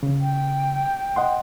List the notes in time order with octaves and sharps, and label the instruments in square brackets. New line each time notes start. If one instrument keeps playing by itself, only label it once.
[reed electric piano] C#3
[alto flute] G5
[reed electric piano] D#5 F#5 C6